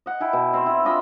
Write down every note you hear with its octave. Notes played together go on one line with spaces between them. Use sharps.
D#5 F#5
E4 G5 G#5
B2
C4 C6
E4
D4 F4 D#5 B5